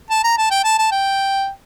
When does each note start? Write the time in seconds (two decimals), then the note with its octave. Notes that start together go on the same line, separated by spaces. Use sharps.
0.10 A5
0.24 A#5
0.38 A5
0.51 G5
0.64 A5
0.78 A5
0.92 G5